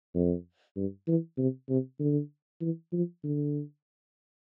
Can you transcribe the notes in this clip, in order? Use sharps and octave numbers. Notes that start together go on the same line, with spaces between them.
F2
G2
E3
C3
C3
D3
E3
F3
D3